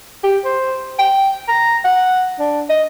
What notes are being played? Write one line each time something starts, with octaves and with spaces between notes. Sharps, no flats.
G4
C5
G5
A#5
F#5
D4
D#5